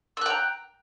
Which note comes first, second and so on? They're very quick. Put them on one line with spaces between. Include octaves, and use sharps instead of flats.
E6 F#6 G5 A#5